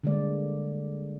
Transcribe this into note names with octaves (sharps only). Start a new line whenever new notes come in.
D3 G3 G#3 A#3 D5